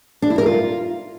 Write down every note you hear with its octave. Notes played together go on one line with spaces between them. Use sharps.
D4
E4
A#4
F4